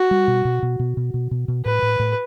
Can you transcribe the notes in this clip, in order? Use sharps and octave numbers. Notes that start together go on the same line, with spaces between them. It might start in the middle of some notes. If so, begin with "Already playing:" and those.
Already playing: F#4
G3
B2
B2
B2
B2
B2
B2
B2
B2
A2 B4
A2
A2